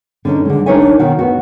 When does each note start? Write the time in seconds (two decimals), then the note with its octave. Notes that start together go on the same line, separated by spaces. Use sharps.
0.25 D3 C#4 D#4
0.45 D3 G#3
0.66 D4 D#4 A#4 C#5 E5 G#5
0.99 B2 D#3 F#4
1.19 B3 F#4